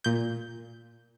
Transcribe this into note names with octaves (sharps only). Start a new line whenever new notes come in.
A#2 G6